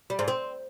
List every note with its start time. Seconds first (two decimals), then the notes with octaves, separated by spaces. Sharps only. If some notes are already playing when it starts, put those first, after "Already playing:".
0.10 G3
0.19 G#2
0.28 C4